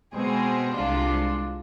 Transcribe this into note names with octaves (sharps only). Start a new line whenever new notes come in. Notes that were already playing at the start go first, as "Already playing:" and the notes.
B2 G#3 C4 G#4
C2 C3 G#3 D4 F4